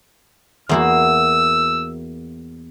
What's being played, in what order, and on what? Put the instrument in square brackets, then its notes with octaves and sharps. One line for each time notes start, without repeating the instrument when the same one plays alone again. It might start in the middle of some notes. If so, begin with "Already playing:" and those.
[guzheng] E2 A#3 F#4 [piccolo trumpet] E6